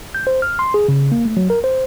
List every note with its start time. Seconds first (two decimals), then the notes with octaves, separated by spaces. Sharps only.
0.15 G6
0.27 C5
0.42 F6
0.59 C6
0.74 G#4
0.88 C#3
1.12 A#3
1.25 A3
1.37 F#3
1.50 A#4
1.64 C5